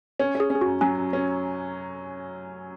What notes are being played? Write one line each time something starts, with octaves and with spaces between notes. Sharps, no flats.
C#4 C#5
C#4 G#4
C#4
G#4
F#4
F#2
F#3 C#4
F#2
C#4